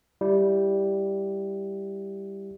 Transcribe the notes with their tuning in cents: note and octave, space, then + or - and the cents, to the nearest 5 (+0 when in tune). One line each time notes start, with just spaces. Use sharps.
G3 +0 E4 +0